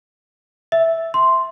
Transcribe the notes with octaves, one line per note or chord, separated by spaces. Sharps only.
E5
C6